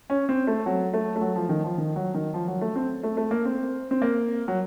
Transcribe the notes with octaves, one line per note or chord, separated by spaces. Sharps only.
C#4
C4
A3
F#3
A3
A3
F#3
F3
D#3
F3
D#3
F#3
D#3
F3
F#3
A3
C4
A3
A3
A#3
C4
C4
A#3
F#3